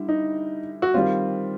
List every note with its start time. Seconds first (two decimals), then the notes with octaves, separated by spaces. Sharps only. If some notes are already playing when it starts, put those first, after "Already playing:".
Already playing: D3 G3 E4
0.09 D#4
0.82 F#4
0.94 D#3 G3 C4 F4